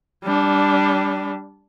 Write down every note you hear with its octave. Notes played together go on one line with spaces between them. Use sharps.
G3 D4